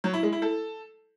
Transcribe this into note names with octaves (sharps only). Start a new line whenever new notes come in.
F#3
E4
G#3
E4
A4